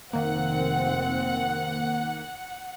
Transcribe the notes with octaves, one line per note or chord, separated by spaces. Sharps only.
F1 D#3 A#3 C4 F#5